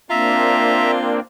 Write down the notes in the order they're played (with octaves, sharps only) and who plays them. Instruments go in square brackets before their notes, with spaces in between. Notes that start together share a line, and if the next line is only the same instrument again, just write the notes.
[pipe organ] A#3 C4 D4 [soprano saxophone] F4 [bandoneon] E5 A#5